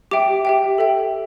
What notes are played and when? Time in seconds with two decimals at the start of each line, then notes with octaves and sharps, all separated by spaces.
0.11 G4 E5 G5 D6
0.45 G4 E5 G5
0.78 A4 E5 G5